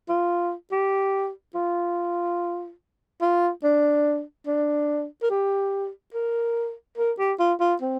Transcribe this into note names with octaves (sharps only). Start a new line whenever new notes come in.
F4
G4
F4
F4
D4
D4
A#4
G4
A#4
A#4
G4
F4
F4
C4